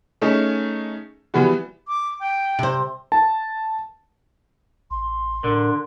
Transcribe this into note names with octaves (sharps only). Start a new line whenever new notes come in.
A3 C#4 D#4 G#4 E7
E3 G3 B3 F#4
D6
G5
C3 C5
A5
A1 C6
A2 D3 A#4